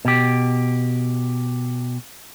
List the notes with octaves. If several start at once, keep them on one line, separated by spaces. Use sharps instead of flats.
B2 G4